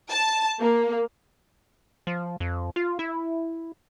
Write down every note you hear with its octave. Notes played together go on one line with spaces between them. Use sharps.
A5
A#3
F3
F2
F4
E4